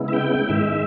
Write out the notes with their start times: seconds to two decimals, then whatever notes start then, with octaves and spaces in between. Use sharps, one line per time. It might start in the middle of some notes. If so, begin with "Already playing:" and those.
Already playing: C#3 G#3 B3 E4
0.08 E5
0.13 G5
0.49 G#2 D#3 G#3 E5